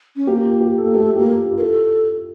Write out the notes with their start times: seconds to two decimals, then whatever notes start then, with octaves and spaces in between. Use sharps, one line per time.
0.16 C#4
0.27 A#3 G4
0.45 F4
0.61 G4
0.78 A4
0.83 A#3
0.94 A3 G4
1.16 A#3 G4
1.27 F4
1.46 G4
1.53 F4
1.57 A#4
1.61 E4 A4